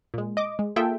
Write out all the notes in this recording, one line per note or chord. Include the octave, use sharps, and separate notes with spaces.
A#2 G#3
D#5 D6
G#3
A#3 F4 G#4 A4 E5 G5